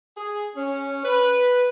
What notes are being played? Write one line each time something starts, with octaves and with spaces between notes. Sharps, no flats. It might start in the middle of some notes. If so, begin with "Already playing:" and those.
G#4
C#4
B4